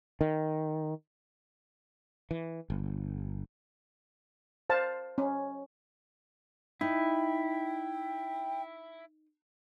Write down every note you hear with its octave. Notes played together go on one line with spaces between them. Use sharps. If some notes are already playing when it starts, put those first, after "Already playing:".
D#3
E3
G1
C5 F5 A5
C#4
D#4 E4 G5